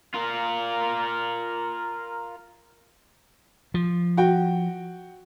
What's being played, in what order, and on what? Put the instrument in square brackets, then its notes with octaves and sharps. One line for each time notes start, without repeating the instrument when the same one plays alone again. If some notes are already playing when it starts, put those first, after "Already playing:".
[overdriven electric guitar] F4 A#4
[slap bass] F3
[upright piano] F#4 G5